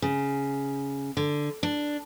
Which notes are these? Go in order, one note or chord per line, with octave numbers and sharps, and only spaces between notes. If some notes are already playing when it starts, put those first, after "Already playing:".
C#3
D3
D4